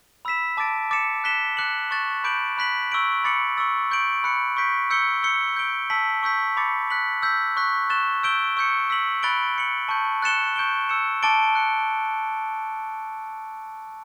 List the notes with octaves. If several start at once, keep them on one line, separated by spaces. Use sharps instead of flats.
B5 E6 B6 E7
A5 D6 A6 D7
D6 A6 C#7 E7
F#6 B6 E7 G7
D6 F#6 C#7 F#7
C#6 F#6 A6 E7
B5 D6 G6 D7 F#7
B5 F#6 B6 F#7
C#6 E6 G6 D7 F#7
B5 D6 A6 C#7 F#7
C#6 E6 A6
C#6 G6 D7 F#7
B5 F#6 C#7
C#6 G6 B6 D7
E6 G6 C#7 G7
E6 G6 C#7 G7
G6 D7 G7
A5 E6 B6 F#7
C#6 E6 G6 B6
B5 D6 A6 C#7
F#6 B6 F#7
E6 G6 B6
C#6 F#6 B6
C#6 F#6 A6 E7 G7
E6 G6 D7 G7
C#6 E6 G6 C#7
E6 B6 F#7
B5 F#6 A6 D7 G7
G6 C#7 F#7
A5 C#6 G6
F#6 A6 C#7 E7 G7
C#6 G6 D7 G7
E6 G6 C#7 E7
A5 D6 A6 D7 G7
F#6 C#7 G7